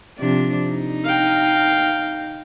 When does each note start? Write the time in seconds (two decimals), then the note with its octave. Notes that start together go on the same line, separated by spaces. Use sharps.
0.18 C3 F3 D4
0.69 D#4
1.04 F5 G5